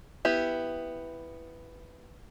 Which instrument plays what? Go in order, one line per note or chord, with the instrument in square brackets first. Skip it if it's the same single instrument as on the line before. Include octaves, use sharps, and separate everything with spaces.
[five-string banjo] B3 E4 G4